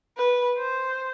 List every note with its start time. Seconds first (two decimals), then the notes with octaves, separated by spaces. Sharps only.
0.17 B4
0.57 C5